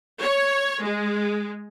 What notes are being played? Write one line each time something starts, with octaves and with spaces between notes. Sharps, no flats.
C#5
G#3